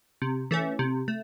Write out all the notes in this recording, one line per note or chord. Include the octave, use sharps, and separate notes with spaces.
C3
E3 A3 C#4
C3
A3